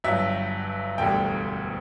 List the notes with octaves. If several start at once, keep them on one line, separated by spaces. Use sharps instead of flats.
G1 G2 F#3 E5
E1 D2 D3 G3 G5